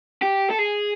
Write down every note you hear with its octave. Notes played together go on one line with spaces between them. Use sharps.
G4
A4
G#4